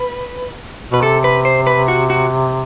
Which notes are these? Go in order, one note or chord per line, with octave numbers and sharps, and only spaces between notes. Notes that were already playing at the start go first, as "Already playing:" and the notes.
Already playing: B4
B2 B4
C3 A4
B4
C5
B4
F#4
F#4